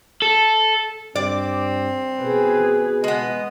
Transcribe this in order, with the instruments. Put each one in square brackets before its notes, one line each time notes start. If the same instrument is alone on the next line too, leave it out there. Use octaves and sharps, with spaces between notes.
[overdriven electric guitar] A4
[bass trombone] G2 [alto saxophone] C4 [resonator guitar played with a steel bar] D5
[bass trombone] B2 [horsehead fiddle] G#4 B4
[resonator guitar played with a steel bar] G#3 B3 [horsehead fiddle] D#5